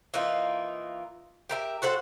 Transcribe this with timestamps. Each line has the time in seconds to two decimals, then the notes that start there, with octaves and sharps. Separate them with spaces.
0.14 E3 A#3 D#4 F4
1.49 G4 A#4 E5
1.82 F#4 A4 C5 F#5